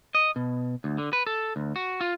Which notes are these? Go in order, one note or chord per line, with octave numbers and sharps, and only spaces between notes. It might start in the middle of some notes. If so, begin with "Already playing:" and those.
D#5
B2
D2
D3
B4
A4
D2
F#4
F4